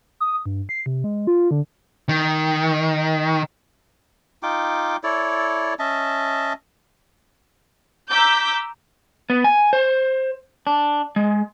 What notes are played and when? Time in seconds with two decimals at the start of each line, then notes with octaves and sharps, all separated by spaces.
0.20 D#6
0.46 G2
0.69 C7
0.86 C3
1.04 G#3
1.27 F4
1.51 D3
2.09 D#3
4.43 D#4 F4 G5 D6
5.04 E4 A4 C#5 D5
5.79 C#4 D#5 E5 A5
8.11 A#5 D6 E6 G6 B6
9.30 B3
9.44 G#5
9.73 C5
10.67 D4
11.16 G#3